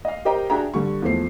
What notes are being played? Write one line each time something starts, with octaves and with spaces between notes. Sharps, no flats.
D#5 F5
G4 A#4 C5 D#5 G5 A#5
D4 F#4 G#4 E5 G5 A#5
D3 G3 C#6
E2 F3 A3 C5 C7